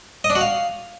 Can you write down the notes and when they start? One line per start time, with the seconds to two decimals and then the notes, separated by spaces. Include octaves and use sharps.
0.24 D#5
0.30 D4
0.35 F#4
0.41 F5